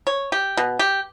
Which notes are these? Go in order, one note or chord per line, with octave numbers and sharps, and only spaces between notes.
C#5
G4
B2
G4